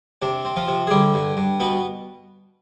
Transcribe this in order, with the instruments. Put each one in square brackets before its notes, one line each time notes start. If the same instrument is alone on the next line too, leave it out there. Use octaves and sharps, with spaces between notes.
[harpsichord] C3 D4
C4
F3 F4
C3
G#4
D3 G3 G4
G2
G2
B2 B3 B4